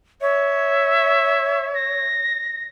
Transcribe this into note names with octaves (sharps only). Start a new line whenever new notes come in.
C#5 E5
A#6